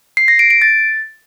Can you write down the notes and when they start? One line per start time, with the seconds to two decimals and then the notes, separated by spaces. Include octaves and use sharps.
0.17 C7
0.28 A#6
0.39 D7
0.50 D7
0.62 A6